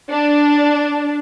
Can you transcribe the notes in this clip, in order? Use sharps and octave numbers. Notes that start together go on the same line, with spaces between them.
D4